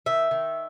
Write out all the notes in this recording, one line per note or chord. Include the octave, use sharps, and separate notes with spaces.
D#3 E5
D#3